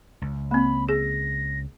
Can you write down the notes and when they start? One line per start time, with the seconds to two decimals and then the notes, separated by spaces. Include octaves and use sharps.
0.22 C#2
0.51 A#3 C4 B5
0.89 G#4 A#6